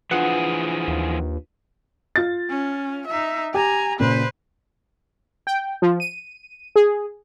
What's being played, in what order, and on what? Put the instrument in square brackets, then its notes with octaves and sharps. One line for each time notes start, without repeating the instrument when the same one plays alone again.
[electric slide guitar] E3 F3 G#4 [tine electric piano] D4 F4 B4 [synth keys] F#5
[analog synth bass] D#2
[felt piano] F4 A6
[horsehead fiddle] C#4
D#4 E5
[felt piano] G4 [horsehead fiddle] G#5 A#5
[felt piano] A#2 C#3 [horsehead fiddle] B4 C5
[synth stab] G5
F3
D#7
G#4